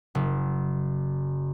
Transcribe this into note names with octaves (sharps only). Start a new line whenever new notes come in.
F#1